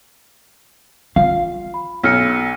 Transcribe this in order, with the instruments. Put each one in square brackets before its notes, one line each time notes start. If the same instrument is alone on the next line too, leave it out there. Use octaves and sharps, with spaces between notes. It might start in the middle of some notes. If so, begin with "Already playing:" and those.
[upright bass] F4 [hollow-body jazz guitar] F5
[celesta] B5
[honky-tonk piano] B1 [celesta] E6 F6 C#7